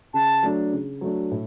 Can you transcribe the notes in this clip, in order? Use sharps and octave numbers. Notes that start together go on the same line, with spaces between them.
C#3 A5
F#3 A3 D4
C#3
F#3 A3 D4
A2